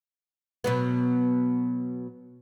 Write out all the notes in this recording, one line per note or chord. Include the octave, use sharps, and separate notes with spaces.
B2 F#3 B3